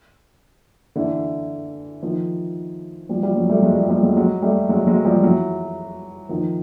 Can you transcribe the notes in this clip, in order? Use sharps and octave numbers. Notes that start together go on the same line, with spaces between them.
D3 E3
D#3 F3
F3 G3
F3 G3
F#3 G#3
G3 A3
F#3 G#3
F3 G3
F3 G3
F#3 G#3
F#3 G#3
G3 A3
F#3 G#3
F#3 G#3
F3 G3
E3 F#3
D#3 F3